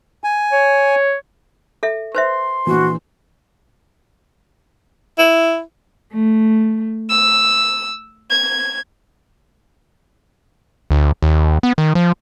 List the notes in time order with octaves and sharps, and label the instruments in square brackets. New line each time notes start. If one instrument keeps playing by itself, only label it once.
[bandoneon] G#5
[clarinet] C#5
[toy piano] A4 E5
[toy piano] B4 C5 E5 [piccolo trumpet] C6
[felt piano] A#1 E3 [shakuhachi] F#4
[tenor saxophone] E4
[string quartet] A3
E6
G#6
[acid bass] D2
D#2
B3
D#3
F3